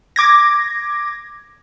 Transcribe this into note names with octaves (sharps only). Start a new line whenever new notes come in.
D6 G#6 A#6